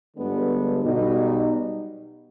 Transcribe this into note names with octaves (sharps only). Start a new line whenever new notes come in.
G1 G2 D3 G#3 B3
B1 B2 G3 D#4